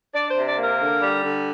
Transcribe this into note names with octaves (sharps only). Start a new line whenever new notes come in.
D4 D5
C5
C3
D5
A#3
A#4
D3
G3
D3